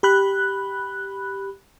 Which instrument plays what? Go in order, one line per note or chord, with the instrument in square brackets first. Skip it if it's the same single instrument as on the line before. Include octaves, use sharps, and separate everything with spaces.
[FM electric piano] G4 B5 F#6